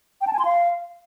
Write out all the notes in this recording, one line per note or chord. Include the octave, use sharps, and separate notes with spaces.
G5
A5
G#5
C6
F5